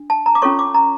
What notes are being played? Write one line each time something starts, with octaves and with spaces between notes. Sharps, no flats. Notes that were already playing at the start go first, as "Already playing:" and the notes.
Already playing: D4
A5
A#5
D6
C#4 F4 A4 C#5 C#6
D6
A#5